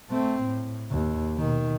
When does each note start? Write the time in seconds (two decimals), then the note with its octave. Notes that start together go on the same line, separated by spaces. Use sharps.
0.11 A3 C4
0.45 A2
0.91 D#2
1.38 B2 D#3